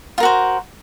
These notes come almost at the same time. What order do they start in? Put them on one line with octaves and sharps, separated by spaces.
F4 A#4 F#4 C5